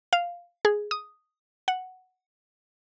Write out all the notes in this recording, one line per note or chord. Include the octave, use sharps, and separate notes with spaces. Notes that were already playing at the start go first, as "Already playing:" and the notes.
F5
G#4
D#6
F#5